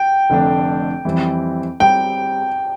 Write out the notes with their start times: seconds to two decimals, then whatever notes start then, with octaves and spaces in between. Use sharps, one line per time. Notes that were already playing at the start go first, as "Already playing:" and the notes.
Already playing: G5
0.30 F1 F2 D3 A3 D4
1.05 F2 E3 G3 C4
1.80 G3 C4 G5